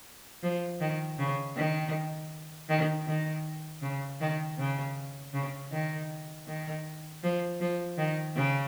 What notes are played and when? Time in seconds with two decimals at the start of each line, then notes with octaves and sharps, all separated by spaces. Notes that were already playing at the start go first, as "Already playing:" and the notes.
0.43 F3
0.81 D#3
1.19 C#3
1.56 D#3
2.69 D#3
3.07 D#3
3.82 C#3
4.21 D#3
4.58 C#3
5.34 C#3
5.72 D#3
6.48 D#3
7.23 F3
7.61 F3
7.98 D#3
8.36 C#3